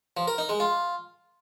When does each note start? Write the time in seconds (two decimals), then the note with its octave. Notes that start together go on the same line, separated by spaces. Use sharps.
0.17 F3
0.27 A#4
0.38 D#4
0.49 G#3
0.60 F4